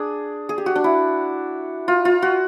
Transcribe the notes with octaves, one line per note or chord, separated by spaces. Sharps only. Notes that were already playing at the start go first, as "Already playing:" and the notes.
Already playing: D4 G#4
G#4
G4
F#4
D4
E4
F4
F4
F#4